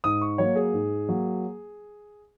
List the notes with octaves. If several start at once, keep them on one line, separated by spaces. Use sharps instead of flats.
G#2 D#6
C#6
F#3 A#3 C#5
G#4
G#2
F#3 A#3